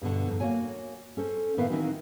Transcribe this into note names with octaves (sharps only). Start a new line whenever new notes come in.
G2 B2 D3 F#5
F2 G#2
A#3 F#4 C#5 G#5
C#4 A4 C5
A2 D#3 B3 B4 E5 F5
D#3 E3 C4 C#4 D#4 F#4